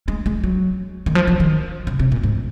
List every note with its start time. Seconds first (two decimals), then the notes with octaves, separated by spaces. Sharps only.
0.08 G#3
0.26 G#3
0.44 F#3
1.06 D#3
1.15 F3
1.27 F3
1.40 D#3
1.87 C#3
2.00 C3
2.12 A#2
2.23 G#2